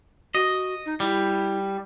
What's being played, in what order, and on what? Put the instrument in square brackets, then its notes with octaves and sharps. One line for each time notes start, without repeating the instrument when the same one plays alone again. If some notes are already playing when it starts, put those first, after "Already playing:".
[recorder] F#4 [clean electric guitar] D#5
[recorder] D#4
[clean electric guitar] G3 [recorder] E4